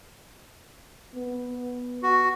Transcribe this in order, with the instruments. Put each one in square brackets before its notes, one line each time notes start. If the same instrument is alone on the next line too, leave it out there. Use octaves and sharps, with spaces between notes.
[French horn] B3
[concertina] F#4